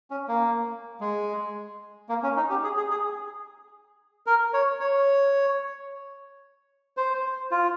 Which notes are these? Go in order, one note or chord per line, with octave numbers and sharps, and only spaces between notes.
C#4
A#3
G#3
A#3
C#4
D#4
G4
G#4
G#4
G#4
A#4
C#5
C#5
C5
F4